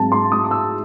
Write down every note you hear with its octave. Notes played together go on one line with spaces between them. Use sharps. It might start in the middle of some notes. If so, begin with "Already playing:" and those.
Already playing: G#2 F#3 C4 A5
C6
D#6
D#6
E6